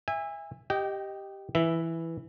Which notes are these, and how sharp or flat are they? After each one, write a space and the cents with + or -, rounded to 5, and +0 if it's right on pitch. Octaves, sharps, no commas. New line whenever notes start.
E5 +0 G#5 -30
G4 +0 D#5 +0 G5 -30
E3 +0 B4 +0 E5 +0